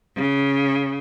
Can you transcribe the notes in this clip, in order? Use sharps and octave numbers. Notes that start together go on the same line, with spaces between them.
C#3